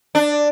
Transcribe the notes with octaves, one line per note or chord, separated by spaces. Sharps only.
D4